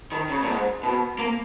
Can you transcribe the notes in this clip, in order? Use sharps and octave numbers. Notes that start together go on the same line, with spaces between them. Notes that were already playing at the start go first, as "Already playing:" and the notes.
D#3
C#3
A#2
G#2
B2
A#3